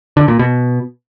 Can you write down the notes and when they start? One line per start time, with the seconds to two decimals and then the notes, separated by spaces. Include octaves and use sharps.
0.17 D3
0.28 A#2
0.39 B2